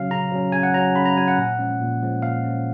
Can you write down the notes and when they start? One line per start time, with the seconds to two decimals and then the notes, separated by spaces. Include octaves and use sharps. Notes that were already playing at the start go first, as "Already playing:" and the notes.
Already playing: C#3 F#3 C#4 F5
0.10 C#3 A#5
0.31 F#3 C#4
0.52 C#3 G#5
0.63 F#5
0.74 F#3 C#4 A#5
0.96 C#3 B5
1.05 A#5
1.17 F#3 C#4 G#5
1.28 F#5
1.38 A#2
1.59 F3 G#3 C#4
1.80 A#2
2.02 F3 G#3 C#4
2.22 A#2 F5
2.44 F3 G#3 C#4